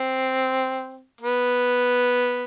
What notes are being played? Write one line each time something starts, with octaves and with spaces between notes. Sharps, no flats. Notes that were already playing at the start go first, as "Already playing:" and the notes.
Already playing: C4
B3